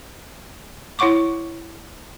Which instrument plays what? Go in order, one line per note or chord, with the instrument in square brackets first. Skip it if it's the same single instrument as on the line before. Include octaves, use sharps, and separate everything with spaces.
[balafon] E4 C#5 F#5 C#6 D6